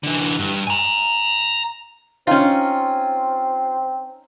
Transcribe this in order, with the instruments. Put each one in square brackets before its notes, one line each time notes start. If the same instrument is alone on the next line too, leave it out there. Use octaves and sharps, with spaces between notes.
[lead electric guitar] D3 E3
G2
G#5 A#5
[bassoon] C4 [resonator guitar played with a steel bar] C#4 D#4 [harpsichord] F4